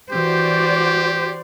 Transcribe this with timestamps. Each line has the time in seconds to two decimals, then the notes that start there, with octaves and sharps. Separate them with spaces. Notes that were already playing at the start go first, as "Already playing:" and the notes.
0.12 E3 F#4 G4 C5 D5